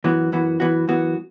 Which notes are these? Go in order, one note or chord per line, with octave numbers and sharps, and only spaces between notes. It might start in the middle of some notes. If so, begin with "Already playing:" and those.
F#2 E3 B3 F#4
F#2 E3 B3 F#4
F#2 E3 B3 F#4
F#2 E3 B3 F#4